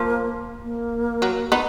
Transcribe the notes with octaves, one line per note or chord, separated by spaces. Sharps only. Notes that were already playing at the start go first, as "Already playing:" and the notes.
Already playing: F3 A#3
A#3
F#3
B3 D#4